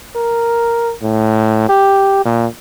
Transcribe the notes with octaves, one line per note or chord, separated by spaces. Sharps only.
A#4
A2
G4
A#2